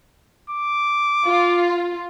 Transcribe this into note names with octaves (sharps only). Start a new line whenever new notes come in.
D6
F4